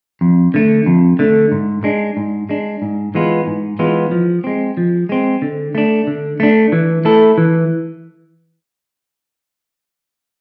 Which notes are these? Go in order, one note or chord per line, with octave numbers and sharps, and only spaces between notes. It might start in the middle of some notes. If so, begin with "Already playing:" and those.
F2
D3 A3
F2
D3 A3
G#2
G#3 D4
G#2
G#3 D4
G#2
E3 G#3 B3 F4
G#2
E3 G#3 B3 F4
F3
G#3 C4
F3
G#3 C4
D3
A3 D4
D3
A3 D4
E3
A3 E4 A4
E3